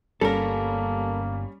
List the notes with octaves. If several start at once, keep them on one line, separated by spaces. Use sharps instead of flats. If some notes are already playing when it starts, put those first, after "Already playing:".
G1 G3 A#3 C#4 A4 A#4